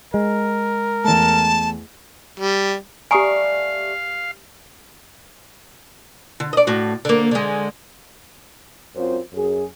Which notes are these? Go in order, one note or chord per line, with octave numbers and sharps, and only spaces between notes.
G#3 A#4
E2 A3 A5
G3
G3 A3 G4 F5 G#5 A#5 C#6 D#6
D3
D5 D#5
A2 F#4
D3 A#3
D3 G#3
F#2 C4 F4 C5
F#2 G#4